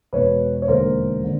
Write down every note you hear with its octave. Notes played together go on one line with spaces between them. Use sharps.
E1 E2 B2 B4 C#5
C#5
E1 D#2 D3 A#4 C5
D3